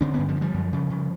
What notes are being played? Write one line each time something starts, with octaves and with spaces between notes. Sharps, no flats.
D3 C4 D4
G2 B3 C#4
F3 G3
G2
F3 G3
F#2
C#3
C#3